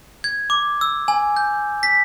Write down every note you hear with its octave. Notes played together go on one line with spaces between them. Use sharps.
G#6
D6
E6
G#5
G6
B6